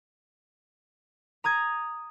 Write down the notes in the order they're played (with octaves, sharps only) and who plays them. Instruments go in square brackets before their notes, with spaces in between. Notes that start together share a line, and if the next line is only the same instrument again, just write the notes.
[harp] A#5 D#6 G#6